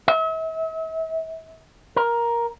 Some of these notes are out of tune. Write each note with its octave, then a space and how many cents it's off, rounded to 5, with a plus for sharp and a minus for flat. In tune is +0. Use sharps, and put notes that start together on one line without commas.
E5 -40
A#4 +10